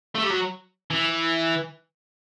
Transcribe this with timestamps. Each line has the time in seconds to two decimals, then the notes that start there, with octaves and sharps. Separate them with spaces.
0.15 A3
0.23 G3
0.31 F#3
0.91 E3